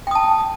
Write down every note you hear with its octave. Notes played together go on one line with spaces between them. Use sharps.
G5 A5 D#6